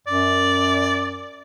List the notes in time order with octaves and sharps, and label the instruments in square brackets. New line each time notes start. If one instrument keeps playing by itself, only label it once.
[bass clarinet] F#2 [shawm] D5